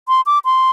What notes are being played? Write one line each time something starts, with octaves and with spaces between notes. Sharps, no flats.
C6
D6
C6